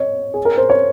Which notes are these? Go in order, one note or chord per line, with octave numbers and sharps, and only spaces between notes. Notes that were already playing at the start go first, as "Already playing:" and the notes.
Already playing: C#5 D#5
G#4
A#4
C5
C#5